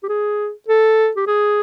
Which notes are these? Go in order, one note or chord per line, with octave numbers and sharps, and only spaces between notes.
G4
G#4
A4
G4
G#4